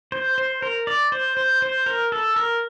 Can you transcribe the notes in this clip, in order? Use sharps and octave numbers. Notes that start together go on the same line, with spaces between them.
C5
C5
A#4
D5
C5
C5
C5
A#4
A4
A#4